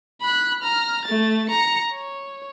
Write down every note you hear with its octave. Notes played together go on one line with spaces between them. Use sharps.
B5 F#6
A#5 F6
A3 A6
A#5 C#7
C#5